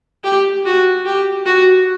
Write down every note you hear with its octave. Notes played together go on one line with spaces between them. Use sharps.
G4
F#4
G4
F#4